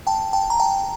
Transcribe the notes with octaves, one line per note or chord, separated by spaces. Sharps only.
G5 A5
G5 A5
A#5
G5 A5